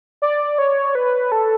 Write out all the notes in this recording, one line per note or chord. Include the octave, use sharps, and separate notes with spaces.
D5
C#5
B4
A4